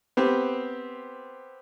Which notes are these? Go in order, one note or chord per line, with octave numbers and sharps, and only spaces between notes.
B3 C4 G4